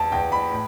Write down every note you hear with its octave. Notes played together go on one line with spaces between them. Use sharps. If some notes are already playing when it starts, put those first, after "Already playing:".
Already playing: E2 A5
E2 G5
B5
A2